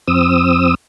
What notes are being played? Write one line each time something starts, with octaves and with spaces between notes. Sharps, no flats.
F2 C4 D#6 E6